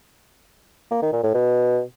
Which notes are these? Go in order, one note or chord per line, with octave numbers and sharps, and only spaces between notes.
A#3
D#3
A#2
A2
B2